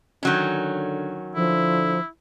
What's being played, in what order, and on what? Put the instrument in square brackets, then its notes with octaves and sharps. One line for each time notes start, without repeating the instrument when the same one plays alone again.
[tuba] D3 [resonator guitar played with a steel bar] D#3 F#3 C#4
[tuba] D3 [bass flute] F3 [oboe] E4